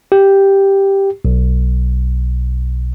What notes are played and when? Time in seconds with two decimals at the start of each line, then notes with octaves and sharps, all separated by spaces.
0.12 G4
1.25 B1